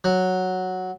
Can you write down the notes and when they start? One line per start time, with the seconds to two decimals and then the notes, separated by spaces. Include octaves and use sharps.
0.04 F#3